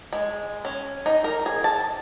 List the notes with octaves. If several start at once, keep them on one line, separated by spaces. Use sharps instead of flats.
G#3
C#4
D#4
A#4
G#4
A5